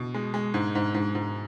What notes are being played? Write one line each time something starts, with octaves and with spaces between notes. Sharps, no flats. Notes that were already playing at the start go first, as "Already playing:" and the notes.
Already playing: B2
G#3
G#3
G#2
G#2
G#2
G#2